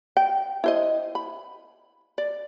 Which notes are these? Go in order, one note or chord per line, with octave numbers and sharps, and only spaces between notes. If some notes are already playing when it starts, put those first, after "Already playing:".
G5
E4 C5 D#5
B5
D5